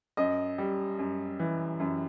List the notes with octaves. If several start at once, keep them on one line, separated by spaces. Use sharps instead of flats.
F#2 D#5
G3
F#2
E3
F#2